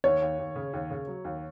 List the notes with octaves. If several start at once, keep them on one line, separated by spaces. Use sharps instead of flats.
D#2 C#5
D#2
D#2
C#3
D#2
C#3
F#3
D#2